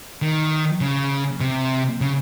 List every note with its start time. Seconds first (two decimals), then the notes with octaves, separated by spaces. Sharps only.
0.22 D#3
0.81 C#3
1.41 C3
2.01 C#3